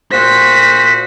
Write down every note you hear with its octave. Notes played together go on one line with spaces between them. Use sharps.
A#2 F#4 C5 B6